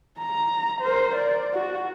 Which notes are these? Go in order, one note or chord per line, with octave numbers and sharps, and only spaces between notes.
A#5
A#4 C5
D5
F#4